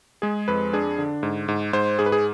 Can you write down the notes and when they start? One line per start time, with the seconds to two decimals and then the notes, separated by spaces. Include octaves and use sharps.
0.22 G#3 G#4
0.48 F2 B4
0.73 D4 G#4
0.98 D3
1.23 G#2
1.48 G#2
1.73 G#2 C5
1.99 G#2 G#4
2.06 B4
2.12 G#4